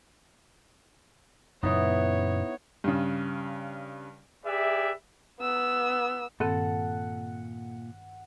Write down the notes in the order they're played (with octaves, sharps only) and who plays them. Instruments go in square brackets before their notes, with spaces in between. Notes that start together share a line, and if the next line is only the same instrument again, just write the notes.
[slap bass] F#2 A#2 C#3 [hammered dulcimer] B3 [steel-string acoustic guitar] D#4 E4 [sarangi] C#5
[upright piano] G2 C#3
[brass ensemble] G4 G#4 B4 D5 E5
[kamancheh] B3 E6
[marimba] G2 D#3 C4 [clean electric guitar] A#2 [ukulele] A4 [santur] F#5